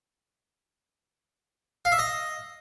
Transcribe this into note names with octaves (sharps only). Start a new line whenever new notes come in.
F5
E5
D#5